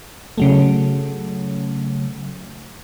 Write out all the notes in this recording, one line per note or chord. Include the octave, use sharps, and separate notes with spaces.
C#3 F#3 A3